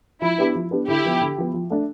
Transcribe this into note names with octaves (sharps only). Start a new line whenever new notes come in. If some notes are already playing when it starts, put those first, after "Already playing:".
F3 E4
B3 D4 G4 B4
F3
B3 D4 G4 B4
D3 E4 G4
F3 B3
D3
F3 B3
F3
A3 D4